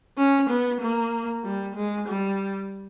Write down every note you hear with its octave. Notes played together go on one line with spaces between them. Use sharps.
C#4
B3
A#3
G3
G#3
G3